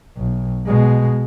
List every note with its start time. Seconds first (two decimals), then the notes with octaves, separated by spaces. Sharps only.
0.17 B1
0.67 B2 G#3